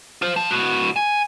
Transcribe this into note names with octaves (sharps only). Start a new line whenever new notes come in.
F4 C5
F3
A2 F#4
G#5